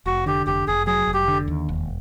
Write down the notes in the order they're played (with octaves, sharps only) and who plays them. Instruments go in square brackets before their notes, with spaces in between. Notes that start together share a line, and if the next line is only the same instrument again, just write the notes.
[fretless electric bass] F1 [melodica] F#4
[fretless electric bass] D3 [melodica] G4
[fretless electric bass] F1 [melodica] G4
[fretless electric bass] F1 [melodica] G#4
[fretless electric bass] F#3 [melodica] G#4
[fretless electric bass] F1
[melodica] G4
[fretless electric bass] D3
D#2
E1